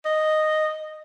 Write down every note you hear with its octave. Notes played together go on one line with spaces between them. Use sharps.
D#5